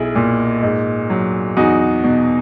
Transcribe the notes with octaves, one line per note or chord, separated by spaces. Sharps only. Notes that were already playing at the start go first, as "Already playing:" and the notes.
Already playing: B1 E4 G#4
A#2
G#2
F#3
E2 D#4 F#4
B2